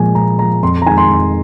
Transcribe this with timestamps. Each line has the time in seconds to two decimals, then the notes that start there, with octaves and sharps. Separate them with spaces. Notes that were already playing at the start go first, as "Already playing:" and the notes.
Already playing: A#2 F3 G#3 G#5
0.15 A#2 A#5
0.39 F3 G#3 A#5
0.63 F2 C6
0.82 A#5
0.86 D#3 G#3 G#5
0.98 C6
1.09 F2